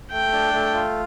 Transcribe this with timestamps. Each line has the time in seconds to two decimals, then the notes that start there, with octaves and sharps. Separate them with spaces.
0.11 A3 G5
0.32 D4
0.53 A3
0.74 F4